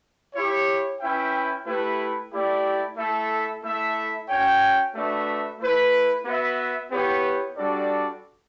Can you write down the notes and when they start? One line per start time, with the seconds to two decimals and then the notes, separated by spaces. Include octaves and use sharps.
0.34 E4 G4 C#5
1.00 C#4 E4 B4 E5 G5
1.66 A3 E4 G4 B4
2.32 A3 E4 G4 D5
2.97 A3 E4 A4 E5
3.63 A3 E4 A4 E5
4.29 C#4 F#4 C#5 G5
4.94 A3 D4 F#4 B4 E5
5.59 A3 E4 B4
6.25 B3 F#4 B4 E5
6.91 B3 E4 G4 C#5
7.57 G3 D4 F#4 A4 D5